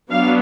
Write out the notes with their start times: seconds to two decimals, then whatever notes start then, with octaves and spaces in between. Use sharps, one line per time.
0.11 F#3 B3 D4 F5